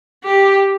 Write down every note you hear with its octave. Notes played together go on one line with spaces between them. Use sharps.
G4